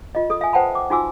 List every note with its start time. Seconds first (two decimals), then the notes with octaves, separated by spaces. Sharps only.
0.15 F4 D#5
0.30 A4 D#6
0.41 E5 G#5
0.53 B4 C5 F#5 G5 A5 B5
0.75 D6
0.90 D#4 F4 F#4 G#5 D6 E6